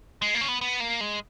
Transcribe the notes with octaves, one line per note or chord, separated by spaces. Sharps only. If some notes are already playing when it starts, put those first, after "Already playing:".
G#3
A#3
C#4
B3
B3
A#3
G#3